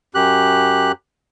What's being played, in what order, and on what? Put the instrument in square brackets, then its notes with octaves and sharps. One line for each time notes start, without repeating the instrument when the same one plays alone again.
[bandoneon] F#2 G4 F#6